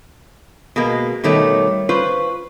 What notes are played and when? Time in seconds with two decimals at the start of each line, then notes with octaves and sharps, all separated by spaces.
0.76 B2 G#3 A#3
1.24 B2 D#3 G3 A3 C#5 D6
1.89 F4 B4 C5 C#6